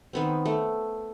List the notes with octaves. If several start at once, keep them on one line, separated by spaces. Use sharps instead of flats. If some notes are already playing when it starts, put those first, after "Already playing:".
D#3 B3 C4
A3